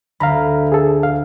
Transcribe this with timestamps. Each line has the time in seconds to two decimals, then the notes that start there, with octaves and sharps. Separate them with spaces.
0.20 D2 F5 A#5 B5
0.72 G#4 A4
1.03 F5